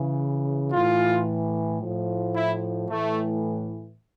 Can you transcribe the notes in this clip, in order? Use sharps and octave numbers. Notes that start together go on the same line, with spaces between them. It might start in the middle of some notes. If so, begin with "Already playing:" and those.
Already playing: C#3 E3
A2 E3 F4
A2 F3
E4
A2 E3 A3